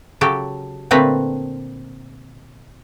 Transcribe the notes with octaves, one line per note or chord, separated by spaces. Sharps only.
C#3 F#3 G4 A4
A#2 D3 A3 C4 B4 A#5